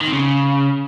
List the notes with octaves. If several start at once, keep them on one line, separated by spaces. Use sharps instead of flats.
D#3
C4
C#3